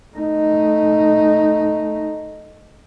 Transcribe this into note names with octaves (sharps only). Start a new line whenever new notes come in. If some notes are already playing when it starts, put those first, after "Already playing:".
A3 D#4